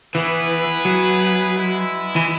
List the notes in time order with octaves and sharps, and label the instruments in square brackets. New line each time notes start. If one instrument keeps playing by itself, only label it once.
[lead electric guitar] E3 [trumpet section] B3 E4 G#4 B4
[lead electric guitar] F#3
[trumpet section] G#3 B3 E4
[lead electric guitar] E3